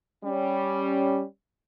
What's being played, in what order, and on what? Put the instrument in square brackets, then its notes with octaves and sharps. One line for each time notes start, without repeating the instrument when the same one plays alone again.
[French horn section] G3 C#4